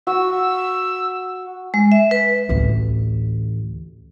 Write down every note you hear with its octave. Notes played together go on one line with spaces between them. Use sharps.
F#4 E6
G#3
E5
B4
A1 D2